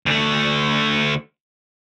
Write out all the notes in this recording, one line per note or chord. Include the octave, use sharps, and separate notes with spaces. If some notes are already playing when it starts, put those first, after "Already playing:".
D2 A3